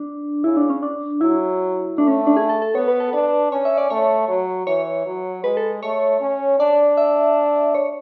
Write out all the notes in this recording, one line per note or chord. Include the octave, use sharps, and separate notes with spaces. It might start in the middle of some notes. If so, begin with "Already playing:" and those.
Already playing: D4
C#3 E4
D4
C#4
D4
F#3 E4
A3 D4
C#4
D4
G#4
A4
A4
B3 C#5
B4
A4
D4 B4
C#4 C#5
E5
D5
A3 C#5
F#3
E3 C#5
F#3
G#3 B4
A4
A3 C#5
C#4
D4 D5
E5
C#5